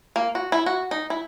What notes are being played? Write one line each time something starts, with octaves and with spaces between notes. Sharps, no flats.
A#3
F#4
E4
F#4
D#4
E4